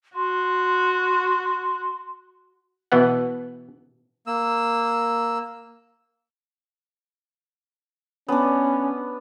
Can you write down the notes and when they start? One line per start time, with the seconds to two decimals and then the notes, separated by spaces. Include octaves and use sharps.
0.16 F#4 C6
2.92 B2 E3 B3 F#5
4.27 A#3 E6
8.29 B3 C#4 D4